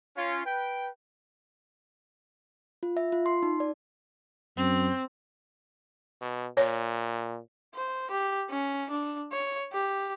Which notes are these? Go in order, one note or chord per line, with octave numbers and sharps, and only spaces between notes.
C#4 F4
B4 G5
F4
E5
F4
C6
D#4
D5
F#2 C4
B2
A#2 C#5
C5
G4
C#4
D4
C#5
G4